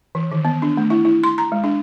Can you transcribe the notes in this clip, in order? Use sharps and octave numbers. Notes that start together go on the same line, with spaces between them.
E3
D#3
B3
D4
A3
E4
E4
C6
A#5
G#3
D4